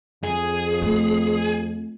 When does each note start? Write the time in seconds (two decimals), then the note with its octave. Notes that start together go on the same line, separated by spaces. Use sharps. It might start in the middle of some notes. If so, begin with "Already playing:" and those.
0.24 F2 G#4
0.82 A3 F4